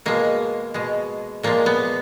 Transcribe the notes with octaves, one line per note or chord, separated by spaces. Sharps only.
B2 G#3 A#3
B2 G#3
A#2 F3 G#3 A#3
B3